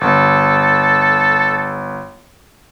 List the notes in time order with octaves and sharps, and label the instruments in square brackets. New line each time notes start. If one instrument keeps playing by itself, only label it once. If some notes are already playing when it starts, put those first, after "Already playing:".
[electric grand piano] G1 [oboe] A4